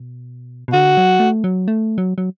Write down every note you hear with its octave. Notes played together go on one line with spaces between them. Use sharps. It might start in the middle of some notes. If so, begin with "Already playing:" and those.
Already playing: B2
B2
D3 F#4
F#3
A3
F#3
A3
F#3
F#3